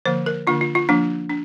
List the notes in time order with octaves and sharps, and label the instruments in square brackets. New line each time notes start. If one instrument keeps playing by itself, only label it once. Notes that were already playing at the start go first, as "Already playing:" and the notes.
[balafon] D3 F3 A#3 C5
A#4
D3 A#3 D4 F4
F4
F4
F3 A#3 D4
D4